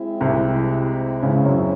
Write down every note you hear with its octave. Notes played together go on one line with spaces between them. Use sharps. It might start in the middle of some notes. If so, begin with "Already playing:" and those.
Already playing: G#3 C4 E4
C2 C3
C#2 C#3
F#2 F#3